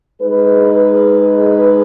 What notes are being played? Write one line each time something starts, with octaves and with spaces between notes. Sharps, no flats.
G#3 D#4 G#4 B4